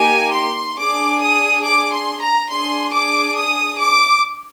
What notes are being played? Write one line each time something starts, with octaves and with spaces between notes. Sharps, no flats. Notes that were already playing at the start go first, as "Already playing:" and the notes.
Already playing: A#3 D#4 G4 G#5
C6
D4 G#4 D6
D#6
D6
C6
A#5
D4 G#4 C6
D6
D#6
D6